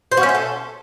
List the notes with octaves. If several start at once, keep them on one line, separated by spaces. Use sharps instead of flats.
C5
F#4
C#4
E5
A4